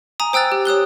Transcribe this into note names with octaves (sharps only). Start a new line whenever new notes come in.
G#5 A#5 D#6
C5 G5 E6 F#6 A6
G4
C#5 D#6 F#6 G7